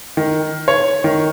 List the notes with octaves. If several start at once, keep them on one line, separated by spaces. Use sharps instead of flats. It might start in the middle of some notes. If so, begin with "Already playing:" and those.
D#3
C#5
D#3